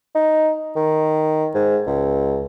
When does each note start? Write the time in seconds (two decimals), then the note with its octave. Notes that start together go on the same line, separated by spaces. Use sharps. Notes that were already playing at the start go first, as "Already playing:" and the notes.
0.15 D#4
0.76 D#3
1.54 G#2
1.87 C#2